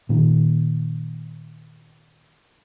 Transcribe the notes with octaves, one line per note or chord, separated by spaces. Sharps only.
A#2 D#3